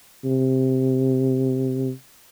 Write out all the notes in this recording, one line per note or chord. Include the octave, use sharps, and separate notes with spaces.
C3